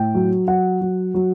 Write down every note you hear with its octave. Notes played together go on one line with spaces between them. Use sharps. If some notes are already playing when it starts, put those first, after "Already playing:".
Already playing: A2 G5
F#3
F#3 F#5
F#3
F#3